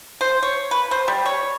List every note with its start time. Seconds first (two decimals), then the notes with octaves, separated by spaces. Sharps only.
0.21 C5
0.43 C#5
0.71 B4
0.91 C5
1.08 G3
1.25 C#5